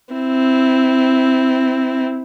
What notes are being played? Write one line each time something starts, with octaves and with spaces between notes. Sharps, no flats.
C4 E4